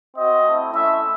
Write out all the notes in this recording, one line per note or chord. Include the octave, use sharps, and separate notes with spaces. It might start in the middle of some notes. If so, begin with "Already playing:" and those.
C4 F#4 D#5
A3 C4 E4
A3 C#4 E4 E5